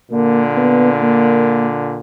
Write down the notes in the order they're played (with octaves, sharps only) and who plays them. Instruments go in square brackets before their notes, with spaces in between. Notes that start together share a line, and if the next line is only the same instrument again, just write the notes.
[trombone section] A#2 D3 [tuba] A#3
[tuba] B3
A#3